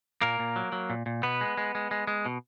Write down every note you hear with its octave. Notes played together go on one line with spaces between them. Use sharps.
A#2 A#3 A#4
A#2
F#3
F#3
A#2
A#2
B2 B3 B4
G#3
G#3
G#3
G#3
G#3
B2